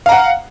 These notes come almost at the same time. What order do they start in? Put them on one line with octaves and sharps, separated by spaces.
F5 A#5 F#5